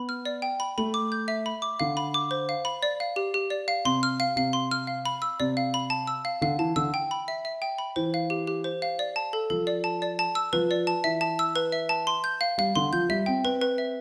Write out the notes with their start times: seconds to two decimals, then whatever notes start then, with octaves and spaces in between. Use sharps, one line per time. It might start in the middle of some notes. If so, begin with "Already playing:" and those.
Already playing: B3 B5
0.09 F6
0.25 D5
0.42 G5
0.60 B5
0.78 A3 B5
0.94 D6
1.12 G6
1.28 E5
1.46 B5
1.62 D6
1.80 D3 F5
1.97 B5
2.14 D6
2.31 C5
2.49 F5
2.65 B5
2.83 D5
3.00 F5
3.16 G4
3.34 G4
3.50 D5
3.68 F5
3.85 C3 C6
4.03 F6
4.20 F5
4.36 C3 F5
4.53 C6
4.71 F6
4.87 F5
5.06 B5
5.22 E6
5.40 C3 D5
5.57 F5
5.74 B5
5.90 A5
6.07 E6
6.25 F5
6.41 D3 F5
6.59 E3 A5
6.76 D3 E6
6.94 G5
7.11 B5
7.28 E5
7.45 E5
7.62 G5
7.78 B5
7.96 E3 C5
8.14 F5
8.30 G4
8.47 G4
8.64 C5
8.82 F5
8.99 D5
9.16 A5
9.33 A4
9.50 F3 A4
9.67 D5
9.84 A5
10.02 D5
10.19 A5
10.35 E6
10.53 F3 B4
10.71 D5
10.87 A5
11.04 E3 E5
11.21 A5
11.39 E6
11.56 B4
11.72 E5
11.89 A5
12.07 C6
12.24 G6
12.41 F5
12.58 G3 F5
12.76 D3 C6
12.93 F3 G6
13.09 G3 E5
13.26 C4 G5
13.44 C4 B4
13.61 B4
13.78 E5